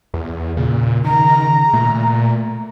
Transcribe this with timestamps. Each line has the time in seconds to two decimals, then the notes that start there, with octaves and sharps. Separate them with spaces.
0.14 E2
0.57 A#2 C#3
1.05 D#3 A#5
1.73 A#2 A3